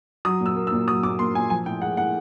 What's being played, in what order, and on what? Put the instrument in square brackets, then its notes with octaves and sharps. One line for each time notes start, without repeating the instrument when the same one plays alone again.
[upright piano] F#3 D#6
A#2
E6
A#3
E6
A#2
F#3 D#6
A#2 D6
A#3 C6
A#2 G#5
F3 G#5
A2 G5
G#3 F#5
A2 F#5